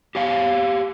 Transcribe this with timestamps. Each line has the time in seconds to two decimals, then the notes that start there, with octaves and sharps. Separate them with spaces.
0.15 G4 C#5 F5